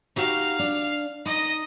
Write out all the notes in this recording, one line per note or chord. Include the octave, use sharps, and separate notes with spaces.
D#4 F#4 G4 F5
D4
D#4 D#5 A#6